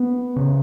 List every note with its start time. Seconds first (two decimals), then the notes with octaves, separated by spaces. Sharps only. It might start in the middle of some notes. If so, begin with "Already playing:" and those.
Already playing: B3
0.36 C#3